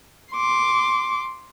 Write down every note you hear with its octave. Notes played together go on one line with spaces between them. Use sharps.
C6 D6